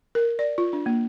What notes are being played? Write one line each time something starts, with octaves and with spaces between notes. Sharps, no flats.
A#4
D5
F4
D4
A#3